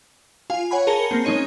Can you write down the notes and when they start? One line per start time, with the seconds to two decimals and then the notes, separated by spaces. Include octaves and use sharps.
0.50 F4 F5 G#5
0.71 C#5 F#5 G#5 B5
0.87 G#4 A#4 A5 C#7 G7
1.11 A#3 C4
1.25 G#3 C#4 D#4 C#5 D#7